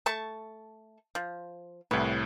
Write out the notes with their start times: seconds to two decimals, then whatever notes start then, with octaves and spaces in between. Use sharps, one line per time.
0.06 A3 A5 C#6
1.15 F3
1.91 C2 A2 B4